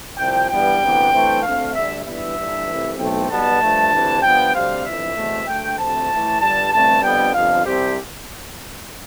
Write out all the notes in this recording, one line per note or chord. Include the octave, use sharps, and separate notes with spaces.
C2 C3 F3 G5
G2 E3 G3 B3 G5
D2 C3 E3 B3
G2 E3 A3 C4
D2 D3 A3 C4 F5
D2 D3 G3 E5
G1 G2 E3 G3 B3 E5
G1 G2 E3
C2 C3 E3 A3
B1 A2 E3 A3 C4 G5
B1 B2 G3 B3 A5
G2 F3 A3
D2 C3 E3
G2 F3 B3 G5
D2 C3 G3 C4 F5
G1 F2 E3 E5
E2 B2 A3 C4
D2 D3 A3 G5
D2 C3 F3 A3 C4 A5
A2 E3 A3
G1 G2 D3 G3 A5
A1 G2 D3 A3 C4 A5
G1 F2 D3 G3 B3 G5
G1 F2 C3 F3 F5
C2 C3 G3 C4 G4